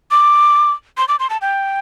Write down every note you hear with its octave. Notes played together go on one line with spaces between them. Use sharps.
D6
C6
D6
C6
A5
G5